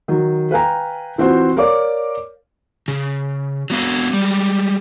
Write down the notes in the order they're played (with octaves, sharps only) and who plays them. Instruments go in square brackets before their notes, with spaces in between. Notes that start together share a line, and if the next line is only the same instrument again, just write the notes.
[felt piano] D#3 F#3
B4 F5 G5 G#5 A#5
E3 C4 F4 F#4 C5
A#4 C#5 D5 F5 D6
[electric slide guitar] C#3
F#3 B3 F5
G3 G#3